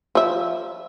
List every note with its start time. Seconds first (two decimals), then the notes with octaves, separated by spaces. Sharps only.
0.15 F3 E5